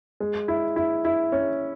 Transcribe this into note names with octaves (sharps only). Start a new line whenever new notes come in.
G#3
E4
E4
E4
C#4